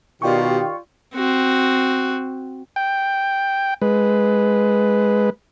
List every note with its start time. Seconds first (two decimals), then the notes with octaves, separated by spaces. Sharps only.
0.22 B2 D#3 F4 G4 D5 G5 C#6
1.15 C4 F#4
2.76 G5
3.82 G#3 B4